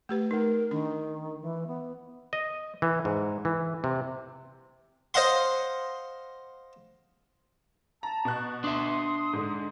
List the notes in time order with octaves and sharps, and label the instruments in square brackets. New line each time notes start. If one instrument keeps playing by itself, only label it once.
[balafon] A3 G4 B4
[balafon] A3 D#4 [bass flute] A#4
[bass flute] D#3 [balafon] D4
[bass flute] E3
B3
[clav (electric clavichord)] D#5
E3
G#2
E3
C3
[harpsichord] C5 D#5 F5 F#5 C6
[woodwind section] A5 [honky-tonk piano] A#5
[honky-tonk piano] B2 F#6
[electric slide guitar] D4 E5 [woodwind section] C6 D#6
[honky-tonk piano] G#2 D3